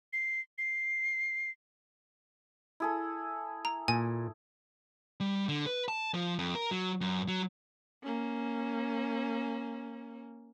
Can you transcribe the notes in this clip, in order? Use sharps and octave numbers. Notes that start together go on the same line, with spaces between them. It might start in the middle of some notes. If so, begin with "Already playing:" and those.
C7
C7
E4 G#4 A4
A#5
A#2 G#5
G3
D3
B4
A5
F3
F2
A#4
F#3
F#2
F#3
A#3 C#4